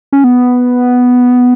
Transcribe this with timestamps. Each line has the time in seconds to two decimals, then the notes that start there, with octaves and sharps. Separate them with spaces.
0.12 C#4
0.24 B3